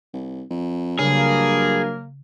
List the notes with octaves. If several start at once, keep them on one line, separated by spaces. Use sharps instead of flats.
C2
F2
G2 C#3 F#3 A#3 G#4 A#4